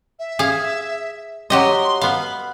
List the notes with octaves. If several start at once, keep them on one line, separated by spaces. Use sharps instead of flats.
E5
G#4 F5
F#3 G4 D#5 C6
B3 F5 B5